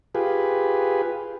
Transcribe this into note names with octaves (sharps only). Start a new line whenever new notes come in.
F4 G4 G#4 B4